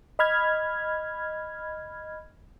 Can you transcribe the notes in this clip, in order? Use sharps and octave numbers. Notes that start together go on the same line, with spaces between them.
D#5 B5 F6 G#6